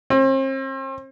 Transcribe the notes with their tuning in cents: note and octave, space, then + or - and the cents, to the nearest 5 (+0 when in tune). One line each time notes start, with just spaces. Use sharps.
C4 +40